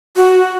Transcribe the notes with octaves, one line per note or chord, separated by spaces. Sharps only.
F#4